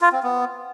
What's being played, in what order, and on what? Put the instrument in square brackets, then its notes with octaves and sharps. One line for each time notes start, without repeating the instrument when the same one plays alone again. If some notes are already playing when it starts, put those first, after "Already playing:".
[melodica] F4
C4
B3